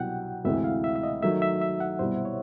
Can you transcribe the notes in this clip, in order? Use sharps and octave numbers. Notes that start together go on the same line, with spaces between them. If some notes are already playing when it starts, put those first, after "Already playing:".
Already playing: C2 B2 F#3 F#5 G5
D2 C3 E3 G#3 E5
F5
E5
E5
D#5
D#3 F#3 A3 E5
E5
E5
F#5
C2 B2 G3 C5
C#5